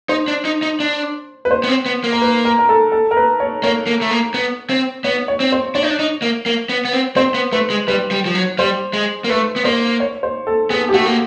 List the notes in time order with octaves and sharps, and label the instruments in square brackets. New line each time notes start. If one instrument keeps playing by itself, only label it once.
[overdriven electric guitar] D#4 [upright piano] C5
[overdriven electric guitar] D4
D#4
D#4
D4
[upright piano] B4
C5
[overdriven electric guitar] B3
C4
B3
A#3
[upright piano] A#4
B4
A#4
A#4
A4
A4
A#4
B4
C#5
[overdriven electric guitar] A#3 [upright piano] C#5
[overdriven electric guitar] A#3
A3
A#3
B3
C4
[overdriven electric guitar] B3 [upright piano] C#5
[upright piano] C#5
[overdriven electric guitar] C4
[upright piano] C5
[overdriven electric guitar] D4 [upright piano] C#5
[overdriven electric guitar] D#4
D4
D#4
A#3
A#3
B3
B3
C4
[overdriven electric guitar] C4 [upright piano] C5
[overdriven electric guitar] B3
[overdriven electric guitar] A3 [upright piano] B4
[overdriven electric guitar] G#3
[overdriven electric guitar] G3 [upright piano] B4
[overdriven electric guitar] G3
F3
F#3
[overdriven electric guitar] G3 [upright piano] C5
[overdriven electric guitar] G#3
A#3
[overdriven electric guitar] A3 [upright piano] B4
[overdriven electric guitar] B3
[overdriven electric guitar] A#3 [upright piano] C5
[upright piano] C#5
C5
A4
[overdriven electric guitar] B3 [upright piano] G#4
[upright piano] G4
[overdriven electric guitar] A3 [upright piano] F#4
[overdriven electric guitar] A#3